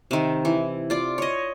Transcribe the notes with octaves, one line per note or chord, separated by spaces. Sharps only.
C3 D#3
E3
F4 D5
C#5 D#5